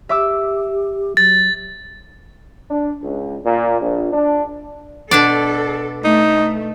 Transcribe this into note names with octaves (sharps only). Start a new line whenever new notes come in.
G4 E5 D6 E6
F#3 A6
D4
C#2
A#2
A#1
D4
B2 D4 A4 D5
A3 D#4